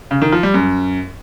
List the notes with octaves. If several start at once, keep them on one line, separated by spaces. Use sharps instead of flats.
C#3
D#3
F3
G3
F#2